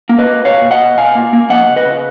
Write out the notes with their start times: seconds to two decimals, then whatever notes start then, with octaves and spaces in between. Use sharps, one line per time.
0.09 A#3
0.19 B4 D#5
0.27 A#3
0.45 B2 C#5 F5
0.62 B2
0.71 D#5 F#5
0.80 B2
0.97 B2 F5 G#5
1.15 A#3
1.33 A#3
1.50 F3 D#5 F#5
1.68 C#3
1.76 B4 D#5
1.86 C#3